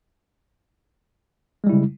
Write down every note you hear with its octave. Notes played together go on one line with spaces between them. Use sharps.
C#3 G3 G#3 E4